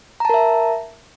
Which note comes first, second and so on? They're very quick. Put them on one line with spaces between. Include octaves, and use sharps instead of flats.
A#5 A5 A#4 E5